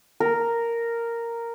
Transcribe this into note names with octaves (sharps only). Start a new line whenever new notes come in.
A#4